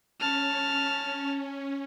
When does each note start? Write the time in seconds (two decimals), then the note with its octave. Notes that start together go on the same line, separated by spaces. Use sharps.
0.20 C#4 A5 F6